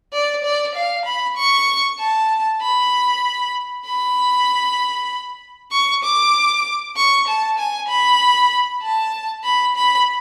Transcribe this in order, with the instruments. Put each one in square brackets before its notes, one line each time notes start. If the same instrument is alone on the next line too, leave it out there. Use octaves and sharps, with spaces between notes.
[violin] D5
D5
F5
B5
C#6
A5
B5
B5
C#6
D6
C#6
A5
G#5
B5
A5
B5
B5